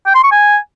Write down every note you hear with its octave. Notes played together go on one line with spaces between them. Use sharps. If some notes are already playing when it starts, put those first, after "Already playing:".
G5
C6
C#6
G#5